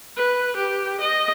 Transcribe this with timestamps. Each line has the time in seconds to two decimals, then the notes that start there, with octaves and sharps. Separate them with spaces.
0.17 B4
0.57 G4
1.00 D#5